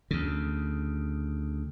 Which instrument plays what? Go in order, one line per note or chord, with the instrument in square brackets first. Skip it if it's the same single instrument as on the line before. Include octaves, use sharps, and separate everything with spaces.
[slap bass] D2 C#3